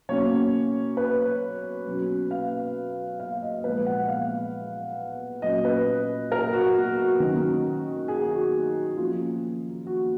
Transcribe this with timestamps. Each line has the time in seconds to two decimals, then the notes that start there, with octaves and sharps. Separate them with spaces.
0.09 B2 F#3 A#3 C#4 C#5
0.97 B4
1.87 B2 F#3 C#4
2.31 F5
3.20 F5
3.42 D#5
3.64 A#2 F3 G#3 B3 B4
3.87 F#5
4.08 F5
5.42 A#2 F#3 C#4 D#5
5.65 B4
6.32 A#4
6.53 F#4
6.76 F#4
6.97 F#4
7.20 D#3 F#3 C#4
8.08 G#4
8.31 F#4
8.97 F3 A#3 C#4 F4
9.87 F#4